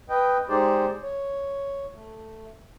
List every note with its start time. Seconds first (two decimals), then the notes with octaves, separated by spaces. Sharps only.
0.10 B4 D#5 G5
0.49 G#3 D#4 G4 G#4 C5 D5
1.02 C#5
1.93 A3